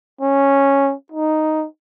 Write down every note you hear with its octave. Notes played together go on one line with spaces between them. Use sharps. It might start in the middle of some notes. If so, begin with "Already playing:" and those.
C#4
D#4